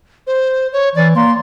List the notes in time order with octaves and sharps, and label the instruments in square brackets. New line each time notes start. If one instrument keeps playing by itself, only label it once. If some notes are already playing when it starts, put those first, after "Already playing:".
[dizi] C5
C#5
[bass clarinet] E3 [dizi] D5
[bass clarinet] A#3 [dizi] C6